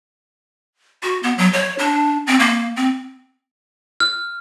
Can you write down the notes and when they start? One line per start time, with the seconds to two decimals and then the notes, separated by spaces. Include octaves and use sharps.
1.03 F#4
1.23 B3
1.38 F#3
1.53 C#5
1.78 D4
2.27 C4
2.39 A#3
2.76 C4
4.00 F6